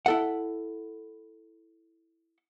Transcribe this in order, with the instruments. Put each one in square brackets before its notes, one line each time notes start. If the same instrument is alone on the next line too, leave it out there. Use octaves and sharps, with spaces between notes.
[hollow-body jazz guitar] E4 A4 F#5